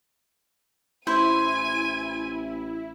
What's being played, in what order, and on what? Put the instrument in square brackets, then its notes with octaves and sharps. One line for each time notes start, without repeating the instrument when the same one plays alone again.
[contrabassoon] A1 [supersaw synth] E4 [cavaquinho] C5 [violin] G#5 D#7